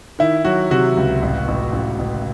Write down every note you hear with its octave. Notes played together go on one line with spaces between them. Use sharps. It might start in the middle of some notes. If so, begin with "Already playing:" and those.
D#3 E4
F#3 F#4
C3 F#4
C#2
A1
A1
A1
A1